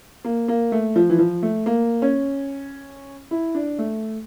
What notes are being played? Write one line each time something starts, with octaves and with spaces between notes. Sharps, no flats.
A#3
A#3
A3
F3
E3
F3
A3
A#3
C#4
E4
D4
A3